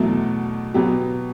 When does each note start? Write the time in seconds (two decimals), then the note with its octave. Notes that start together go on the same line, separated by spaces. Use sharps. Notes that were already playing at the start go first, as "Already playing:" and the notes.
Already playing: E2 B2 F#3 A3 A4
0.74 B2 F#3 B3 G4